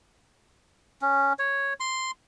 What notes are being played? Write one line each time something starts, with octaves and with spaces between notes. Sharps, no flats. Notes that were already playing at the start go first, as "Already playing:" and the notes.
C#4
C#5
C6